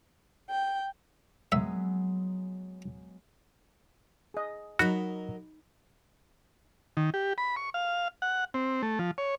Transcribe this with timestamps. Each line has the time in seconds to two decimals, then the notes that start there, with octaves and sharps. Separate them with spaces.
0.50 G5
1.52 F#3 G#3 B3 E5
4.34 G#4 D#5
4.79 F#3 D#4 F#4 A#4 D#5 B5
6.97 D#3
7.14 G4
7.38 B5
7.56 C#6
7.74 F5
8.22 F#5
8.54 C4
8.83 A3
8.99 F3
9.18 C#5